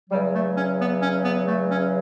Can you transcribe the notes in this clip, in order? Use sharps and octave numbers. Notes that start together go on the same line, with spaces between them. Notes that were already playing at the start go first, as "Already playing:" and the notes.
E2 C#3 F#3 G3
A3
C#4
B3
C#4
B3
A3
C#4